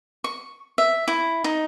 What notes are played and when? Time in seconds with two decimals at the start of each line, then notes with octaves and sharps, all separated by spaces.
0.24 C#6
0.78 E5
1.08 E4
1.44 D#4